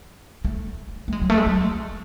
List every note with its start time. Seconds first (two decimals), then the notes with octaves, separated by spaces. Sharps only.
0.45 A3
1.08 A3
1.12 G#3
1.22 F#3
1.30 A3
1.38 G#3
1.46 F#3